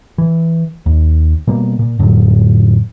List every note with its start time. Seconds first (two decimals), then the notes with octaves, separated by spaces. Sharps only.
0.18 E3
0.86 D#2
1.47 B2 G3 A#3
1.79 A#2
1.99 F2 A2 D3 F#3